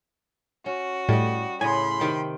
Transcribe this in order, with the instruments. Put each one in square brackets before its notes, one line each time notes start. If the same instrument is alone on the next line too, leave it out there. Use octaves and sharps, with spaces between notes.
[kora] C#4 [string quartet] F#4
[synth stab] A2 [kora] G3 D#5
[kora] A2 C#3 [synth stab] G#5 [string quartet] B5 C6
[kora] C3 D#3 G5